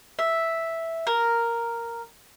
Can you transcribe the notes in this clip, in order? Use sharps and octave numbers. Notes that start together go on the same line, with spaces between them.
E5
A#4